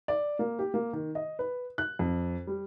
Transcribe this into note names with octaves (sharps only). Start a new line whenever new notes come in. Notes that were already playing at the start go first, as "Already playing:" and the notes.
D5
A#3
G4
A#3
D#3
D#5
B4
F#6
F2
G3